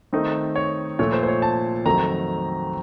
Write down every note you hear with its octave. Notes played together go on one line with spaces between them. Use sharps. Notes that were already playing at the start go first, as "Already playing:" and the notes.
D#3 A3 C4 D#4
C#5
A#2 F3 A3 C#5
C5
C5
C#5
A5
F2 D#3 F#3 A3 C4 A#5